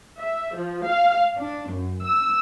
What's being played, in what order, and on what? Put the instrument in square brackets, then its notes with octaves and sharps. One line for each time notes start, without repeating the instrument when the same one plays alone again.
[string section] E5
F3
F5
D4
F#2
E6